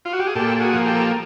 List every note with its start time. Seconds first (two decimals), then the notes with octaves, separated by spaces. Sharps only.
0.05 F4
0.13 F#4
0.19 G4
0.27 G#4
0.35 A#2 G4 A4
0.61 F#4 G#4
0.73 F3 A#3
0.86 G4 A4